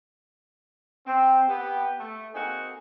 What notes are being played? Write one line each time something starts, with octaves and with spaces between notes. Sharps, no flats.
C4
B3 G4
A3
A#3 C4 D#4 F#4 G#4 A4